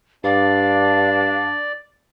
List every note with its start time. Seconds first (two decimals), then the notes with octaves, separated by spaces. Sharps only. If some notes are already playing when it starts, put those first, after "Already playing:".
0.24 G2 D4 D5 F5